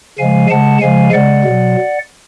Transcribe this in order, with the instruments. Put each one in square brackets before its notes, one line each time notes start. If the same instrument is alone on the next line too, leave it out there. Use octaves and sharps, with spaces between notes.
[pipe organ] C#3 F3 G#3 F5 G#5
C#3 G#3 F#5 A5
C#3 F3 G#3 F5 G#5
C#3 G#3 D5 F#5
B2 F#3